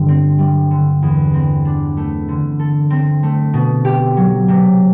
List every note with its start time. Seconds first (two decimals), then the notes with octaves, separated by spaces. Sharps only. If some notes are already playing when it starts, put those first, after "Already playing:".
Already playing: G2 D3 G3
0.08 C4
0.39 G3
0.71 D3
1.03 E2
1.34 C4
1.65 D4
1.97 A3
2.28 D3
2.59 A4
2.90 C4
3.23 A3
3.54 B2
3.85 G4
4.17 F#3
4.48 C3